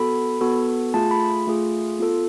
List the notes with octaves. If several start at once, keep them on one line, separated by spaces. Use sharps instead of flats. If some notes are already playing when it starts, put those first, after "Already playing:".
Already playing: B3 F#4 A4 B5
B3 F#4 A4
A3 F4 G#4 A5
B5
A3 F4 G#4
B3 F4 A4